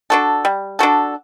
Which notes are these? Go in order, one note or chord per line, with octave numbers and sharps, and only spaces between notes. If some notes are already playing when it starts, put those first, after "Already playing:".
D4 F#4 A4
G3
D4 F#4 A4